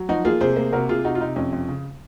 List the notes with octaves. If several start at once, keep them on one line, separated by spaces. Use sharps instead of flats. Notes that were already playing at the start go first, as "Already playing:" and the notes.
Already playing: F#3
F3 D#4 F#4
A#3 F4 G#4
C3 G#4 C5
A#3
C3 F#4 A#4
C3 F4 G#4
C3 D#4 F#4
F4
C3 D#4
F2 C#4
F2
C#3